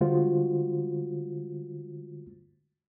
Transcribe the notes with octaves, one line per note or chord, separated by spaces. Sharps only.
D3 G3 G#3 F4 F#4 C5